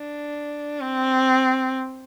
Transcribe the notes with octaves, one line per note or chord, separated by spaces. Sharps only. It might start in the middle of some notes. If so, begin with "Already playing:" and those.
Already playing: D4
C4